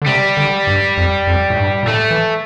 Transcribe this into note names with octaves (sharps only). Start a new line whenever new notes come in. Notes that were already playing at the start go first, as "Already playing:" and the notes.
D3
C3 G3
D3
G2
F2
F2
A2
G2
A#2
A2 A3
E3